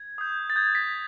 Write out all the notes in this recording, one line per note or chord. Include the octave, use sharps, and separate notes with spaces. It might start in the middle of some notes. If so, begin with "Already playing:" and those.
Already playing: G#6
D#6 G6
A6
D#6 G6 G#6
B6